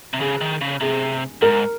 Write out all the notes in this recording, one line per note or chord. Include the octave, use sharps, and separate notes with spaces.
C3
C#3 G#4
D#3
C#3
C3 G#4
G#2 A#4